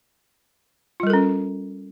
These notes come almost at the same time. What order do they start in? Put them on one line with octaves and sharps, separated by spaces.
F4 G3 A#4 A4 C#4